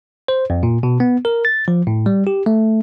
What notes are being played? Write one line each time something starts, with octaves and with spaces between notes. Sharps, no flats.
C5
F2
A#2
B2
B3
A#4
A6
F3
A2
G3
G4
A3